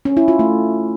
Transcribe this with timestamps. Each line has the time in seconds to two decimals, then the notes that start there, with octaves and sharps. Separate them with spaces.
0.05 C#4
0.17 E4
0.28 F4
0.39 A3